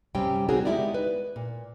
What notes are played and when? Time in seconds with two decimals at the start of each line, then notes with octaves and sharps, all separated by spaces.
0.15 G2 C3 G3 C4 C#4 G5
0.49 C4 D#4 F#4 G#4 A#4 C#5
0.65 G#3 B3 D#4 E4 G4 D5
0.94 B4
1.36 A#2